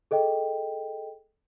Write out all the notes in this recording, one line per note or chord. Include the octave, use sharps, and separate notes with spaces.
G#4 A4 D#5 G5